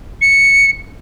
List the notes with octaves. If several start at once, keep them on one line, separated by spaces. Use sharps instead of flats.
C#7